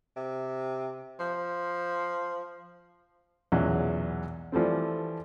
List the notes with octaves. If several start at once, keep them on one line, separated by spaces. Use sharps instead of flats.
C3
F3
B1 E2 A#2 C#3 F#3 G#3
E3 F3 G3 A3 C4